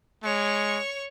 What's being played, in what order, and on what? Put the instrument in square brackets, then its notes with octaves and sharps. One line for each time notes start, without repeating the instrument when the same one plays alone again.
[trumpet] G#3 [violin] C#5 C#6